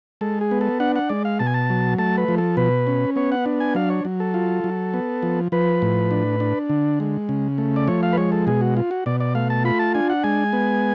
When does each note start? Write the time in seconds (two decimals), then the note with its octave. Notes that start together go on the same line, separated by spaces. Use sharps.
0.21 G#3 A4
0.41 G#4
0.51 B3
0.61 A4
0.80 D4 F#5
0.96 F#5
1.09 G#3 D5
1.25 F5
1.39 B2 A5
1.46 G#5
1.54 A5
1.70 F#3
1.98 A3 A5
2.17 B4
2.28 F3
2.38 A4
2.57 B2 B4
2.87 C#4
3.16 B3 C#5
3.32 F#5
3.46 D4
3.60 G#5
3.75 F#3 F5
3.90 C#5
4.05 F#3
4.20 A4
4.34 F4
4.64 F#3
4.94 B3
5.23 F3
5.52 F3 B4
5.82 A2
6.11 D4
6.40 D4
6.69 D3
7.00 G#3
7.29 C#3
7.58 A3
7.76 D5
7.88 F3 C#5
8.03 F5
8.13 B4
8.17 G#3 C#5
8.32 A4
8.47 B2 G#4
8.61 F#4
8.77 F4
8.91 F#4
9.06 B2 D5
9.20 D5
9.35 A3 F5
9.50 A5
9.64 F4 B5
9.79 A5
9.94 D4 G#5
10.10 F#5
10.24 G#3 G#5
10.53 B3